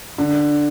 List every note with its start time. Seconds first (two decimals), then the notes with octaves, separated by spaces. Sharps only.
0.18 D3